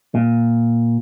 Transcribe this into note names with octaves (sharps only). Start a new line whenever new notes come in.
A#2